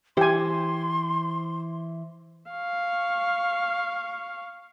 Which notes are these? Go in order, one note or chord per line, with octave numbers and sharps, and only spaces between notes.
E3 E4 G4 C5 G#5 C6
F5 C#6